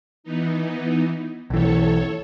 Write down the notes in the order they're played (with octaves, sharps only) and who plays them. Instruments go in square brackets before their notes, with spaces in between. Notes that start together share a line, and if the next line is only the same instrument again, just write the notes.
[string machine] E3 B3 D#4
[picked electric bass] B1 E3 [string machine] A4 C#5